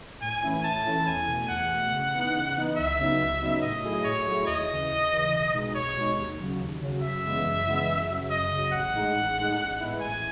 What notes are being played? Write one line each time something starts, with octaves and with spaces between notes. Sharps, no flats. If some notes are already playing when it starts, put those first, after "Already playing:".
A2 G#5
E3 A3 C#4 E4
A2 A5
E3 A3 C#4 E4
E2 G#5
B2 A3
E2 F#5
B2 A3
C#3
E3 B3 D#4
C#3
E3 B3 D#4
C#2 E5
C#3 F#3 B3 D#4
C#2
C#3 F#3 B3 D#4
A2 D#5
F#3 A3 E4 G#4
A2 C#5
F#3 A3 E4 G#4
D#2 D#5
C#3 E3
D#2
C#3 E3
B1
B2 G#3 D#4
B1 C#5
B2 G#3 D#4
D#2
C#3 F#3
D#2
C#3 F#3
F#2 E5
C#3 E3 G#3 B3
F#2
C#3 E3 G#3 B3
F#2
C#3 F#3
F#2 D#5
C#3 F#3
A1 F#5
A2 G#3 D#4
A1
A2 G#3 D#4
A1
A2 G#3 B3 E4
A1 G#5